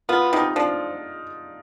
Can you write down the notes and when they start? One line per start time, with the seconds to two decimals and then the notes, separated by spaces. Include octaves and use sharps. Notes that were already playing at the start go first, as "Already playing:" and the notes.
0.09 B3 F4
0.33 C3 D#4
0.56 F3 D4